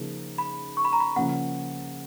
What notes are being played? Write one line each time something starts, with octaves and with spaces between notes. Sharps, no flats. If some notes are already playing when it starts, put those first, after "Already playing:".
Already playing: C#3 F3 A#3 D#4 G#4
B5
C#6
B5
A#5
B5
C#3 F3 A#3 C#4 F#5